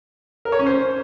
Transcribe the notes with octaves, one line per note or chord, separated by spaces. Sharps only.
A#4
C#5
C#4
C5